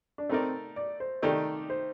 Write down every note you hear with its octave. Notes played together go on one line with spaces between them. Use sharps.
D4
A3 C4 D#4 A#4 D5
D5
C5
D#3 A3 D#4 G4 D5
C5